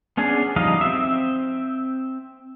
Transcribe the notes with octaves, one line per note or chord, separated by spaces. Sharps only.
B3 C#4 D4 G#4
F3 G3 D#4 D#5 F5
C4 E5